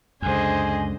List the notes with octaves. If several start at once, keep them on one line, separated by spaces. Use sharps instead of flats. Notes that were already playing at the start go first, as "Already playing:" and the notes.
C#2 F#2 D3 G#4 C5 D#5 G#5